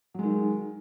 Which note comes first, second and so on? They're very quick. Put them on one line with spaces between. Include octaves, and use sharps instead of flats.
F#3 G#3 D#3